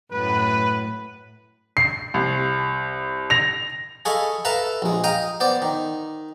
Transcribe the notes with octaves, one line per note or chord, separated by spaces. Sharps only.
F#2 A2 B4
C7
C2
A#6 F7
G#4 A4 D#5 F5 B5 C#6
A4 B4 E5 F5 A#5
A#1 G#3
D#5 F5 G5 A#5 D#6
B3 C5 D5
D#3